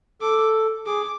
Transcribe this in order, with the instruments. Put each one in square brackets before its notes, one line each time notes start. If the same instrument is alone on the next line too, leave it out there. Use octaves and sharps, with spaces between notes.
[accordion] A4 [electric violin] D6
[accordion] G#4 [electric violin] D6